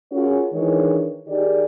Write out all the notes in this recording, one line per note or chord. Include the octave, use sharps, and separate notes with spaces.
C#4 F4 F#4 G#4 A#4 C#5
D#3 E3 G#3 D4 E4 C#5
D#3 D#4 G4 G#4 D5